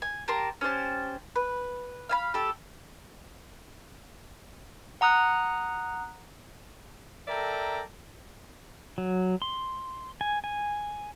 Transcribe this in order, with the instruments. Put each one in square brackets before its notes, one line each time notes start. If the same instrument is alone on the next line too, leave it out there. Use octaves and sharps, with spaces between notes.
[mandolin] G#5
G4 A#4 A5 C6
C#4 G4 C5 A5
B4
F5 G#5 B5
G4 A4
[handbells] F#5 A#5 D#6 F#6
[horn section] A4 A#4 D5 E5 G5 A#5
[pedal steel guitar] F#3
C6
G#5
G#5